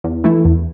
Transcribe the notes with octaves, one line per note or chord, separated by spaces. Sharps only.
E2
E3 A3 E4
E2